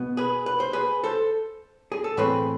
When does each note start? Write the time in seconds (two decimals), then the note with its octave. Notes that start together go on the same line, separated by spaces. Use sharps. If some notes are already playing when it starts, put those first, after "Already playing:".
Already playing: B2 B3
0.17 G#4 B4
0.46 B4
0.60 C5
0.73 G#4 B4
1.04 A4 C5
1.92 G#4
2.04 A4
2.17 A2 E3 A3 C4 G#4 B4